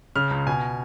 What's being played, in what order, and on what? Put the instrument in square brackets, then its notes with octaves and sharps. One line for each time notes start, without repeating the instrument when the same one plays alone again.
[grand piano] C#3 F6
C#2
B2 G#5